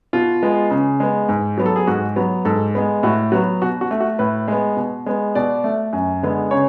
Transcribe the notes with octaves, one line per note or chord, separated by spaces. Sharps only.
B2 F4
G#3 B3
C#3
G#3 B3
G#2
F#3 B3
A4
G#4
G#2 F#4
F#3 B3
G#2 A4
G#3 B3
A2 F#4
F#3 B3 F#4
B2 F#4
F#4
A3
F#4
A2 B4
G#3 B3
B2
G#3 B3
B2 D5
A3
F#2
D3 G#3 B3
C#3 C#5